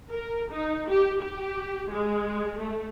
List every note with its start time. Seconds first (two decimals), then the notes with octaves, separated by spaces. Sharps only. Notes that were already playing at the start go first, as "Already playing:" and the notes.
0.10 A#4
0.52 D#4
0.89 G4
1.22 G4
1.91 G#3
2.59 A3